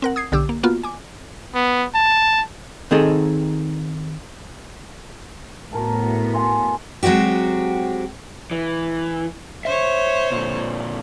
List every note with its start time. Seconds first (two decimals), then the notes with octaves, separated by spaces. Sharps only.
0.02 C4 A#4 F#5
0.16 D#6 G#6 C7
0.32 B1 D3 G4 D6 E6
0.49 A#3
0.63 A#3 B3 F4 F#4
0.83 G#5 D6
1.55 B3
1.95 A5
2.91 D#3 C4 D#4 G#4 A4
5.73 A2 B3 F#4 A#4 A5
6.03 F#4
6.34 F5 G#5 C6
7.03 F#3 G#3 C4 F#4 G4
8.51 E3
9.65 C5 C#5 E5
10.31 A#2 D3